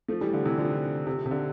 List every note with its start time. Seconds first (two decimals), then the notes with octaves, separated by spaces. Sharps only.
0.08 F3 A3
0.21 E3 G3
0.33 D3
0.45 C3 E3
0.58 D3 F3
1.07 C3
1.26 C3
1.31 D3